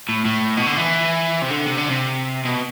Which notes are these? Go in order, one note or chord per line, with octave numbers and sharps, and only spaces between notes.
A2
A2
B2
D3
E3
C3
D3
C3
D3
C3
B2